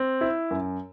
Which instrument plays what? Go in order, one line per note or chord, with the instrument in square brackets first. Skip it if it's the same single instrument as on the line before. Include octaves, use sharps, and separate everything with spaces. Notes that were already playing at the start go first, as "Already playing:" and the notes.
Already playing: [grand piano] C4
E4
F#2